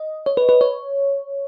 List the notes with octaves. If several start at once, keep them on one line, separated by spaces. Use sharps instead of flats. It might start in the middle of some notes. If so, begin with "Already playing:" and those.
Already playing: D#5
C#5
B4
B4
C#5